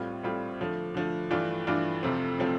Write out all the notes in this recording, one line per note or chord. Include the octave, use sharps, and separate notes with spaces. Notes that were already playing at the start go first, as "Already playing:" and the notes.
Already playing: A2 G3 C4 F4
A2 G3 C4 F4
D3 F3 A3
D3 F3 A3
G2 E3 A3 D4 F4
G2 E3 A3 D4 F4
F2 C3 F3 A3 C4
C3 F3 A3 C4